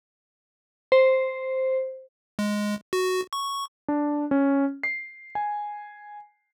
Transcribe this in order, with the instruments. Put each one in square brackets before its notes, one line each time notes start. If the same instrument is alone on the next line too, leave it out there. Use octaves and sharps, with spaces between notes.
[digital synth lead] C5
[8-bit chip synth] G#3
F#4
C#6
[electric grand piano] D4
C#4
C7
G#5